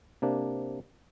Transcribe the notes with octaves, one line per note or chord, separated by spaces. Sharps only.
C3 A#3 D4